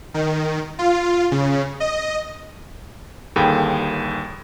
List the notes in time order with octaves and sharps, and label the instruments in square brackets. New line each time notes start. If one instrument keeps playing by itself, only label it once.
[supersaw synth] D#3
F4
C#3
D#5
[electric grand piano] G1 D#2 G#4 A4 G5 B5